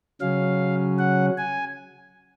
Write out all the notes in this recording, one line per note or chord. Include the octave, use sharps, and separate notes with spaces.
C#3 F#3 C#4 F5
F#5
G#5